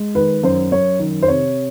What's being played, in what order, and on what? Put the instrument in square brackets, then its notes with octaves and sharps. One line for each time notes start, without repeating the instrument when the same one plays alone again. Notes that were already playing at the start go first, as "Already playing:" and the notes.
Already playing: [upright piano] G#3
D#3 B4
F#2 C5
F#2 C#5
D#3
C5
C3 C#5